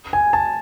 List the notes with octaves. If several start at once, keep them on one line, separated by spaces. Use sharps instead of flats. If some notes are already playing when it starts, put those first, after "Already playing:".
G#5
A5